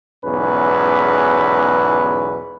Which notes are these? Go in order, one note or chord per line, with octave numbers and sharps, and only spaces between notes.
B1 E2 G#2 C#4 B4